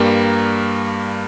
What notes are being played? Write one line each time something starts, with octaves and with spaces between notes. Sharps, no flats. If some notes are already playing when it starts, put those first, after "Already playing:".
Already playing: G2 G3 A#3 A#5